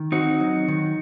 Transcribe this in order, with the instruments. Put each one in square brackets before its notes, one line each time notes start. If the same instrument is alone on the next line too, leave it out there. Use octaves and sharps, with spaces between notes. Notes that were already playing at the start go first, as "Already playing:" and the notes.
Already playing: [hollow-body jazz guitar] D#3
[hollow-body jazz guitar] C4 [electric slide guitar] D#4 F#4
[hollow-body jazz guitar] F#3
D#3